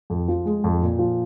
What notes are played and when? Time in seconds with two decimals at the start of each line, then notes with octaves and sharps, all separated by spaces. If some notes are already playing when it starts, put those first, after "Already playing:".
0.10 F2
0.28 F3
0.46 G#3
0.64 F2
0.82 A#2
0.99 F3